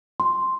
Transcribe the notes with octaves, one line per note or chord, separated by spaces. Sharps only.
C6